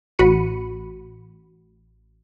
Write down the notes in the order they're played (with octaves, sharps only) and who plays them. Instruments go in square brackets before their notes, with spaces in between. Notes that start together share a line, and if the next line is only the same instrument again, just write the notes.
[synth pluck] A1 F#4 B5 C#7 D#7